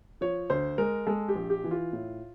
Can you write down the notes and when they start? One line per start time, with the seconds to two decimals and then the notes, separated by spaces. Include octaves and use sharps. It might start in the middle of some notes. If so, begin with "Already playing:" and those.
0.21 F3 C#5
0.50 D2 C5
0.78 G#3 A#4
1.07 G#3 A4
1.29 G4
1.36 A#1
1.50 G4
1.64 E3
1.71 F4
1.93 A2